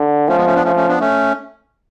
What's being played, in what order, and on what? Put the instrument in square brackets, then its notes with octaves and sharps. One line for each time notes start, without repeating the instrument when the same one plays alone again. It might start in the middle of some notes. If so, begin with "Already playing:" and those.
Already playing: [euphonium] D3
[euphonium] F3 [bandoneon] A3 C#4
[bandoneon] G#3 B3
A3 C#4
B3 D4
[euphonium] F3 [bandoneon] A3 C#4
[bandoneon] A3 C#4
B3 D4
A3 C#4